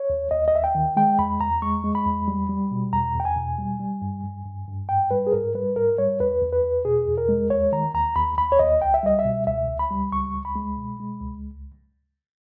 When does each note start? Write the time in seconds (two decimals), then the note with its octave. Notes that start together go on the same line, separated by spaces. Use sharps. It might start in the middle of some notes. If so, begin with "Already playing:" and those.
Already playing: C#5
0.10 D#2
0.31 D#2 D#5
0.48 D#5
0.53 D#2 E5
0.64 G5
0.75 D#3
0.97 G#3 G5
1.19 E2 B5
1.40 E2 A#5
1.62 G#3 C#6
1.84 G#3
1.95 B5
2.06 E2
2.28 G3
2.49 G3
2.72 B2
2.93 E2 A#5
3.15 E2 G5
3.25 G#5
3.36 B2
3.58 G3
3.80 G3
4.02 G2
4.24 G2
4.45 G2
4.68 G2
4.89 G#2 G5
5.11 G3 B4
5.27 G#4
5.32 G#2 A#4
5.55 G3 B4
5.76 G#2 A#4
5.98 G3 C#5
6.20 E2 B4
6.42 E2
6.52 B4
6.64 E2
6.85 B2 G#4
7.07 E2
7.18 A#4
7.29 G#3
7.50 D#2 C#5
7.72 D#3 A#5
7.94 D#2 A#5
8.16 D#2 B5
8.37 D#2 B5
8.52 C#5
8.59 D#2 D#5
8.81 C#2 G5
8.94 E5
9.03 G3 D#5
9.19 E5
9.25 B2
9.47 C#2 E5
9.68 C#2
9.79 B5
9.91 G3
10.12 C#2 C#6
10.34 C#2
10.45 B5
10.56 G#3
10.78 B2
11.00 G#3
11.21 C#2